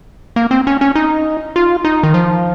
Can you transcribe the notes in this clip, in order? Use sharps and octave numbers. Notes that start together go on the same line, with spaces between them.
A#3
C4
C#4
C#4
D#4
F4
D#4
D#3
F3